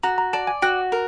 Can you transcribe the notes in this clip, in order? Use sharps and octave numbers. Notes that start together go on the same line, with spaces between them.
F#4 A#5
A#5
D5 A5
G#5
F#4 G5
A#4